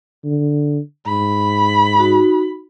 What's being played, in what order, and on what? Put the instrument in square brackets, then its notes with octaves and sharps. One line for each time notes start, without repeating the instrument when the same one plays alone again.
[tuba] D3
[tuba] G#2 [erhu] B5
[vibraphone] D#4 F#4